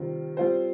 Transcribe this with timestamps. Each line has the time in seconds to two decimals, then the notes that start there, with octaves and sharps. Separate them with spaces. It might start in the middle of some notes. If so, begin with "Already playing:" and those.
Already playing: C3 D#3 G3 C4 F4
0.37 G3 C4 F4 C5